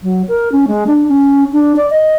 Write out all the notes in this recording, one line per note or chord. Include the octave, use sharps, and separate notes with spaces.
F#3
A#4
C#4
G#3
D4
C#4
D4
D5
D#5